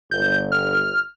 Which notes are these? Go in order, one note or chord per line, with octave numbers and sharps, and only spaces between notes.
G1 G6
F6